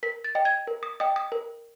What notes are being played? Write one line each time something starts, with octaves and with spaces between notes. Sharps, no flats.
A#4 B6
A6
D#5 G5
G#6
A#4
D#6
D#5 G5 D#6
D#6
A#4